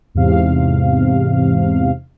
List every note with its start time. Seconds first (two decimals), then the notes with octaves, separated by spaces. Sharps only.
0.15 E2 G#2 C3 F5